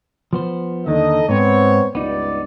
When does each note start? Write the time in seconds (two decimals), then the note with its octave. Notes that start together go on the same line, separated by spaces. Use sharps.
0.33 F3 B3 C5
0.87 D#2 D3 D#3 D#4 A4 D#5
1.29 G#2 B3 C4 C#5
1.95 C#2 G2 B3 D#4 D5